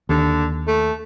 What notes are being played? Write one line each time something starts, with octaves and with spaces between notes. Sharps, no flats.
D#2 D3
A3